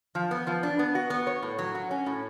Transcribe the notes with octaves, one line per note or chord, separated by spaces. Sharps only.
F3
B3
F3
D4
B3
F#4
B3
C#5
A2
F#3
F#4
C#4
A2